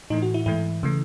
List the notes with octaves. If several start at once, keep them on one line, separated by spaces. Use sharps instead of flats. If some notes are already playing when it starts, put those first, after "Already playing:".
A2 E3 A3 D#4
F#4
E4
G#2 E3 A3 E4
C#3 E3 A3